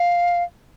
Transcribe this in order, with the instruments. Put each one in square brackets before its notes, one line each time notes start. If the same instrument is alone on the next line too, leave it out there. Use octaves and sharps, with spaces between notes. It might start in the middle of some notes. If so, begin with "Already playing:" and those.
Already playing: [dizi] F5